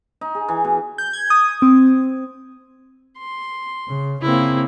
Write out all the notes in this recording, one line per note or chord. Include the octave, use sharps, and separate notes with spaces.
D#4
G#4
E3
B2
G6
G#6
D#6
C4
C6
C#3
C#3 A#3 C4 E4